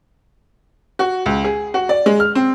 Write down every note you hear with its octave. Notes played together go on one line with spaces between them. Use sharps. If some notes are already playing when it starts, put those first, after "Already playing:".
F#4
C#2
G#4
F#4
D5
G#3
F6
C4